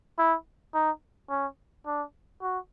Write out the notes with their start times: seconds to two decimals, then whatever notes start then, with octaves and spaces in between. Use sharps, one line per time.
0.19 E4
0.74 D#4
1.30 C#4
1.86 D4
2.42 F#4